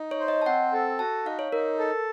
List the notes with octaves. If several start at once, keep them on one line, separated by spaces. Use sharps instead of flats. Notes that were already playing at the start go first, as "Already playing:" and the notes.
Already playing: D#4
C#5
C5
D#5
A5
C4 F#5
A4
F#4 A5
D#4 F5
C#5
D#4 A#4
A4